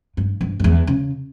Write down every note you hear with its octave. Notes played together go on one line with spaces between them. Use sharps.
G2
G2
G2
E2
C#3